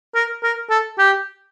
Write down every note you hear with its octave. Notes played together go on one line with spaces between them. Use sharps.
A#4
A#4
A4
G4